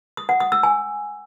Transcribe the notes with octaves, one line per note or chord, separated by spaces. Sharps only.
D#6
F#5
D#6
E6
G#5